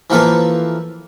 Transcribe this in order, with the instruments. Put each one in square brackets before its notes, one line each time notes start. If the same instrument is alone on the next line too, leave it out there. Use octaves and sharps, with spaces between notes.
[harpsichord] E3 F3 A#3 A4 B4